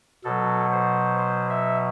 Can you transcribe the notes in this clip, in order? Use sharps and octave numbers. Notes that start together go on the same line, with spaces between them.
B2 F#3 A4
C5
C5
E5